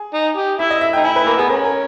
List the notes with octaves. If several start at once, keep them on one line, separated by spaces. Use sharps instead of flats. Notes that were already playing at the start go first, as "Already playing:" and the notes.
Already playing: G#4
D#4
G4
E4 E5
D#5
E5
G5
D#4
E4 G#5
B4
A#3 A#4
B3 G#4
C#4 A#4
A#4